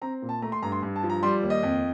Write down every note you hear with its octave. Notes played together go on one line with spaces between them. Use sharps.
C4 A#5
A#2
A5
A3 A#5
C6
G2 A#5
C6
G2
A5
F3
A#5
G3 C6
D#2
D#5
F2